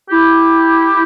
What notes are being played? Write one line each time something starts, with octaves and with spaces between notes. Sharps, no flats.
E4 G4